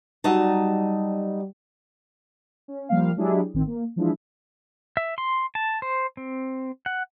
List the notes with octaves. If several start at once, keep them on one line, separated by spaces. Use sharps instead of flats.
F#3 G3 D#4 A5
C#4
F3 G3 A#3 F5
F#3 G#3 D4 E4 G4 G#4
A1 D#3 C4
A#3
E3 F3 G#3 D4 E4
E5
C6
A5
C5
C4
F#5